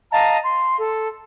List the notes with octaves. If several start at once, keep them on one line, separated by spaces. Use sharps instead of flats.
D#5 F5 A5 A#5
C6
A4